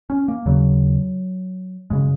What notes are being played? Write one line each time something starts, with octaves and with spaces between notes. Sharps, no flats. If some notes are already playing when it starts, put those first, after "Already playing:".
C#4
A#3
D#2 C#3 F#3
F#2 C#3 G#3